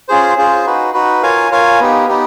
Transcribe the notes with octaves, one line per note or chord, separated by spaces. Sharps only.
C#4 F4 G#4 C5
C#4 F4 G#4 C5
D#4 F#4 B4
D#4 F#4 B4
F4 A#4 C#5 F5 G#5
F4 A#4 C#5 F5 G#5
B3 D#4 G4
B3 D#4 G4